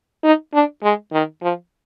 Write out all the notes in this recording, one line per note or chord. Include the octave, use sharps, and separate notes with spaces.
D#4
D4
G#3
D#3
F3